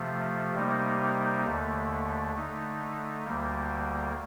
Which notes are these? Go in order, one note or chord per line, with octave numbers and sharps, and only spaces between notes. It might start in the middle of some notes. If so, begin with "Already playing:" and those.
Already playing: C3 F3 A3
C3 G3 A#3 D#4
D#2 D3 A3
D3 A3 D#4
D2 D3 G3 A#3